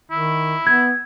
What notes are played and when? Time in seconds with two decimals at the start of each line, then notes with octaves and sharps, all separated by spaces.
0.11 D#3 E4
0.67 B3 G#6